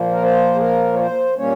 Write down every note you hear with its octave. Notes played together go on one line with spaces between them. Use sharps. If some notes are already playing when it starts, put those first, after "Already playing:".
Already playing: A#2 F3 A#3
A#4
C5
G#4
A#4
C#5
C5
A#2 G3 A#3 C#4 C#5